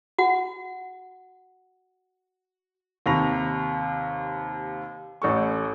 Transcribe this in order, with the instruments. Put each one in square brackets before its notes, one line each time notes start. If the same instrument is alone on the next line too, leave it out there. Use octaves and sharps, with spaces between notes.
[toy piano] F#4 F#5
[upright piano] D#2 C3 B5 C#6 A#6 F7
A1 A4 C#6